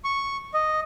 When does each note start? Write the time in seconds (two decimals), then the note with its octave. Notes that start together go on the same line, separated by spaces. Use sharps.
0.04 C#6
0.54 D#5